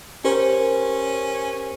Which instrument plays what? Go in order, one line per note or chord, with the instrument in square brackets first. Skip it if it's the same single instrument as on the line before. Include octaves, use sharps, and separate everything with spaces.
[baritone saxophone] C#4 [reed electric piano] G4 A#4 C5